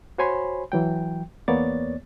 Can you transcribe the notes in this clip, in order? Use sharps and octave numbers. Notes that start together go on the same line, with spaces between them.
F#4 C5 C#5 G#5 B5 C6
E3 F#3 G5
E2 A#3 B3 C#5 D5 A6